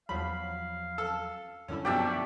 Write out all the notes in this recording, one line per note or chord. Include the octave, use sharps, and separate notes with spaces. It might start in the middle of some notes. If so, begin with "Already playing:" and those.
E2 F3 F#3 F5 B5
A4 E6
F#2 D3 C#4 E4
B2 F3 F#3 G4 D5 E5 C#6